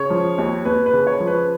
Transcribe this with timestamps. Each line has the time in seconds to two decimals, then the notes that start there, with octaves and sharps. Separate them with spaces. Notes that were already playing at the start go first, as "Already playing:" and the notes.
Already playing: C#3 C#5
0.10 F3
0.38 D#2
0.65 D#2 B4
0.86 B4
0.93 C#3
1.07 C#5
1.20 F3
1.27 B4